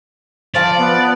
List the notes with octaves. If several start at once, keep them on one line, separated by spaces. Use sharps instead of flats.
F3 D5 F5 A5
B3